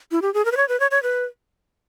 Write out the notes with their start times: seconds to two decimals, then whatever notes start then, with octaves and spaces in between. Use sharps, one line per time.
0.12 E4
0.22 G4
0.34 G#4
0.45 A#4
0.52 B4
0.57 C#5
0.69 B4
0.80 C#5
0.91 C#5
1.03 B4